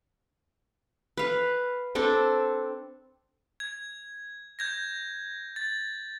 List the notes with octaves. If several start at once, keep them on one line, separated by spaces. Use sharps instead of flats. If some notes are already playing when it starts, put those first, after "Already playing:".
B4 F5
C4 D4 A4
G#6
G6 G#6 A#6
A6